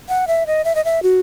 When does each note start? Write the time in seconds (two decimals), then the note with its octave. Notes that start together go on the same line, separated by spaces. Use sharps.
0.09 F#5
0.27 E5
0.47 D#5
0.65 E5
0.75 D#5
0.85 E5
1.03 F#4